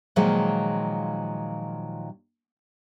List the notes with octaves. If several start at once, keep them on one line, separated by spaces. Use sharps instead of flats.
A#2 D#3 F3 F#3 G#3